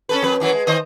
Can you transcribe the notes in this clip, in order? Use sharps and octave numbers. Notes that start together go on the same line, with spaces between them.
C#4 A4 B4
F2 B4
F#2 E3 F#3
G#3
D#3 C5 D#5